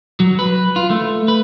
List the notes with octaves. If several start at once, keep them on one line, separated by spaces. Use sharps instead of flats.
F#3
B4
F4
A3
B4